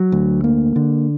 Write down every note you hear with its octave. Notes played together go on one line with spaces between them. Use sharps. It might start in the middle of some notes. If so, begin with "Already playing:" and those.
Already playing: F#3
D2
A#3
D3